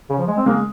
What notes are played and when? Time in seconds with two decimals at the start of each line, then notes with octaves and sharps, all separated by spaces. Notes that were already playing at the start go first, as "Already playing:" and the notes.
0.10 C#3
0.18 F3
0.27 G#3
0.37 C4
0.46 G#3 A#3